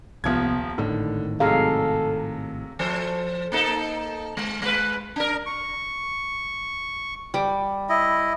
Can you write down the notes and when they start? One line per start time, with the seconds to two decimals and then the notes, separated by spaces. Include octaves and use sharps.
0.24 D#1 C2 E3 F3 B3 G#6
0.78 G#1 A2 D3 D#3
1.40 C3 F#3 G#3 A4 F5
2.79 F3 A4 C5
3.52 A#3 D#4 A4
4.37 G#3
4.62 G#3 B4
5.16 D4 A#4
5.46 C#6
7.34 G3 D6
7.89 E4 D#5